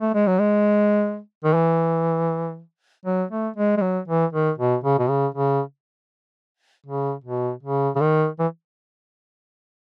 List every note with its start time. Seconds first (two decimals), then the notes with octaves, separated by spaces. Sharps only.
0.01 A3
0.15 G#3
0.27 F#3
0.40 G#3
1.44 D#3
1.54 E3
3.06 F#3
3.31 A3
3.56 G#3
3.77 G#3
3.81 F#3
4.08 E3
4.33 D#3
4.58 B2
4.84 C#3
4.99 B2
5.09 C#3
5.34 C#3
6.86 C#3
7.24 B2
7.63 C#3
7.96 C#3
8.01 D#3
8.39 E3